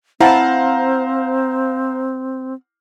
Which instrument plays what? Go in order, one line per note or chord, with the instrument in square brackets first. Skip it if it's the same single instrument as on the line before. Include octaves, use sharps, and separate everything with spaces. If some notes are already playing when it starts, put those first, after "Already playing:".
[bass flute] C4 [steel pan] E4 A5 [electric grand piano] C5 F5 A#5 [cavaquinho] F#5